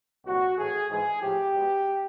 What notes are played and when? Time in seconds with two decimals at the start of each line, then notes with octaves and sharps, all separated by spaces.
0.25 C2 A#2 F#3 F#4
0.56 A2 E3 A3 G#4
0.89 G#2 E3 G#3 G#4
1.21 A2 F3 A3 G4
1.53 B2 G#3 B3